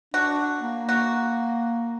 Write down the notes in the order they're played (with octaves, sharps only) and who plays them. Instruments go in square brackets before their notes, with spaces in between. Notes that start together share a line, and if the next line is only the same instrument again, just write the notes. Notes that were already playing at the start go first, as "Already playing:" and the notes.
[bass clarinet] D4 [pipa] F#4
[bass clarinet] A#3
[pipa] F#4